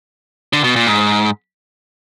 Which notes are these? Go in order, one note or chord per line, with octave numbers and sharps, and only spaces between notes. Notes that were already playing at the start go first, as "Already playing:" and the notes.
D3
B2
A#2
G#2